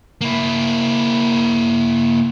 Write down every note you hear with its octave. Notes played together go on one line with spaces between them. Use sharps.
A#3 E4